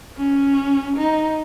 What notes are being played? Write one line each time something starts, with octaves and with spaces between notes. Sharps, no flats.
C#4
D#4